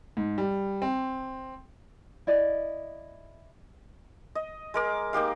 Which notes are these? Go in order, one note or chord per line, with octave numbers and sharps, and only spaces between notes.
G#2
G3
C4
E4 D5 D#5
D#5
G#3 A#4 D6
A#3 D#4 G4 F5